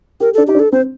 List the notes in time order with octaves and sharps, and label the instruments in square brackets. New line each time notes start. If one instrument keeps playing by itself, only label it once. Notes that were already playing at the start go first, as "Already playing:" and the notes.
[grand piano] G4 [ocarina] A#4
[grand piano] D4 [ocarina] A4
[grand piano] D#4 [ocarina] G4
[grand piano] D4
[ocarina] A4
[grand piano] C4 [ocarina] C5